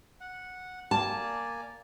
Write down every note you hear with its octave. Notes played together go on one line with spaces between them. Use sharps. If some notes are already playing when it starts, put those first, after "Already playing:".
F#5
A#3 D5 G#5 A5